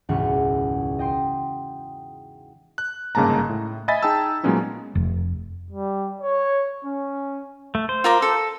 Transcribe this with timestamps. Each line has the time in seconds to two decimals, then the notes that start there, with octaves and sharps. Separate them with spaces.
0.09 E1 C#2 G#2 E3 F#5 C#6
0.99 D#5 G5 C6
2.78 F#6
3.15 G1 G#2 C#3 A#3 A5 A#5
3.49 A2
3.88 D#5 E5 G#5 B5 A6 B6
4.02 D#4 G#4 G5 A5 E6
4.44 A#2 F#3 G#3 B3 C#4 D#4
4.95 F1
5.71 G3
6.22 C#5
6.85 C#4
7.75 A3
7.89 C5
8.04 F4 A#4 D6
8.22 A4